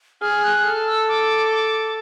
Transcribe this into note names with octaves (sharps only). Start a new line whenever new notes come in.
G#4 F6
F#6
A4 F6
E6
D6
D6